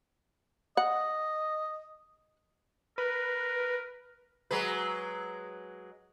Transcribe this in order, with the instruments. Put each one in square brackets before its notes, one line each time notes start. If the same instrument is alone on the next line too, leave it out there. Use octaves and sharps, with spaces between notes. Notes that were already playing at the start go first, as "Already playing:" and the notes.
[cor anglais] D#5 [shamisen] F#5
[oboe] A#4 [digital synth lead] B4
[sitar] F#3 G#3 B4